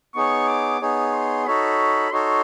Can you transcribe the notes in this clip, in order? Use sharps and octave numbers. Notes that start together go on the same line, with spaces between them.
B3 D#4 G#4 C#5 C#6
D6
B3 D#4 G#4 C#5
C6
D#4 F#4 A4 C#5 B5
D#4 F#4 A4 C#5 C6